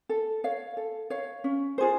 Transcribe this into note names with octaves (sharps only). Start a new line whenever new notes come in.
A4
C#5 F5
A4
C#5 F5
C#4
F4 G#4 C5